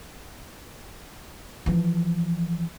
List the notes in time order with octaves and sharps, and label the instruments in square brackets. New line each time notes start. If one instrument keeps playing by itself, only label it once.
[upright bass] E3 F3